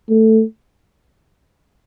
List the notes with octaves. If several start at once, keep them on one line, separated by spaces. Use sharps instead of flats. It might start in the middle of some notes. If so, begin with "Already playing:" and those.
A3